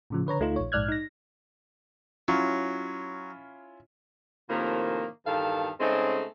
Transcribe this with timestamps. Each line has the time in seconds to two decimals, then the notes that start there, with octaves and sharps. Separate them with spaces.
0.10 A2 C#3 F3
0.27 D3 B4 C#5 A#5
0.40 D2 A3 D#4 F4
0.56 A#1 C#5
0.72 A#1 G#2 D5 F6 F#6 G#6
0.88 D#4 A#6
2.28 F#3 C#4 E4 F4
4.50 A2 C3 D#3 F3 A#3
5.26 E2 G2 D#3 A4 F5
5.80 C#3 G#3 A3 C4 C#4 D#4